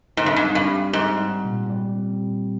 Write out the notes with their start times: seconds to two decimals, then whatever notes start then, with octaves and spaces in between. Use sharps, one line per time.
0.17 G#2 C4
0.26 G2
0.36 G#2
0.43 G3
0.55 G2
0.68 G4
0.93 G#2 G3
1.19 G3
1.45 A#2
1.70 G3
1.96 C4
2.22 A#2